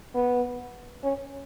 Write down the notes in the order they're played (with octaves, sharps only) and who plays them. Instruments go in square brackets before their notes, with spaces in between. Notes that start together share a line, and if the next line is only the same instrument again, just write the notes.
[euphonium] B3
C#4